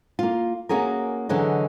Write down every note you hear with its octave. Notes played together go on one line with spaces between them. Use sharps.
A#3 F4
A#3 C#4 F#4 G#4 A#4
D3 E3 F#3 G#4 D#5